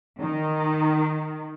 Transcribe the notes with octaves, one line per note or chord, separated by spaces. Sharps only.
D#3